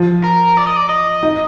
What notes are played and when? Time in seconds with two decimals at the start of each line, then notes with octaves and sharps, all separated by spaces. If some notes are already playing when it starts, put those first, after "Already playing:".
Already playing: F3
0.24 A#4
0.57 D5
0.67 D#5
0.76 D5
0.89 D#5
1.23 D#4